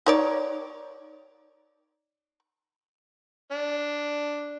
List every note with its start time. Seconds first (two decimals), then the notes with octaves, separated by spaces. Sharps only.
0.06 D#4 C#5 D5
3.51 D4